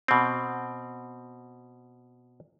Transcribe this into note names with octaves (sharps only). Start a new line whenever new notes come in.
B2 C4